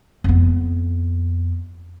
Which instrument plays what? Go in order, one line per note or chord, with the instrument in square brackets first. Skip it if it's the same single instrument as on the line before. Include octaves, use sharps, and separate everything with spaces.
[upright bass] F2 B3